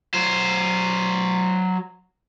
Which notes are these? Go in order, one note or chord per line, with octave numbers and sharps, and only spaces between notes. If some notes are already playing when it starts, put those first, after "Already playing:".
F#3 C5